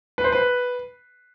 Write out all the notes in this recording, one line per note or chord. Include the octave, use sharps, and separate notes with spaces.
B4
C5
B4